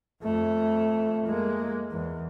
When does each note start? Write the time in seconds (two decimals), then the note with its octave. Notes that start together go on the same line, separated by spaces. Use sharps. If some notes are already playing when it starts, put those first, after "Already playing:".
0.22 F2 A3
1.26 G#3 A#3
1.91 E2